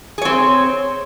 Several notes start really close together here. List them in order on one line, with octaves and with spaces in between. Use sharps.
G#4 C#5 C4